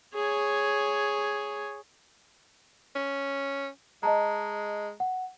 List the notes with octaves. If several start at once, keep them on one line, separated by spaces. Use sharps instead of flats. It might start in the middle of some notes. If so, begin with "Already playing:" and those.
G#4 C#5
C#4
G#3 D#5 A5 A#5
F#5